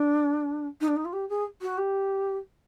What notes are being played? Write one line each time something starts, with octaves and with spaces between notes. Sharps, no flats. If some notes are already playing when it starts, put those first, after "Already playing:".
Already playing: D4
D#4
D4
D#4
F4
G4
G#4
F#4
G4